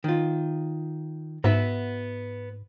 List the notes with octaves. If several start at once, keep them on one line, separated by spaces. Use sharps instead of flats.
D#3 F4
G#2 B3 F#4 E5